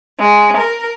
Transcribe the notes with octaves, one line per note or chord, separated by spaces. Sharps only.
G#3
A#4